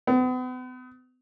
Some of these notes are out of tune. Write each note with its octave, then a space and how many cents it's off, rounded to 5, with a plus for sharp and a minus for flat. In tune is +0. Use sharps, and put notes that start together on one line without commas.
B3 +40